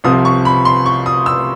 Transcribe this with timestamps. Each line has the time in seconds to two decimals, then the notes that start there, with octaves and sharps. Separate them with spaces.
0.04 C2 C3 F3 D#6
0.25 C#6
0.45 B5
0.65 C6
0.86 C#6
1.06 D#6
1.26 E6